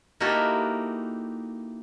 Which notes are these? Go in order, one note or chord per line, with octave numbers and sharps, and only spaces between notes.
A#3 D#4 E4 F#4 G4 A4